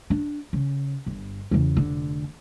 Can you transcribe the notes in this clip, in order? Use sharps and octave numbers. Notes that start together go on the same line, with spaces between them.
D4
C#3
G1
E2 C#3
F1 D3